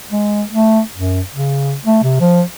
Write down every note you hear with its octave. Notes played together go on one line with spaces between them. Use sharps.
G#3
A3
F#2
C#3
A3
C3
F3